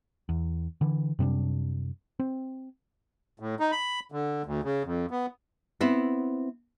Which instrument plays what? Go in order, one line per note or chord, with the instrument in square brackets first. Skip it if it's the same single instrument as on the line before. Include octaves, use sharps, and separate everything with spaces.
[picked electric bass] E2
D3 E3
F#2 C3 G3 D4
C4
[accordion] A2
D#4
B5
D3
D2
C#3
F2
B3
[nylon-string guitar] B3 C4 E4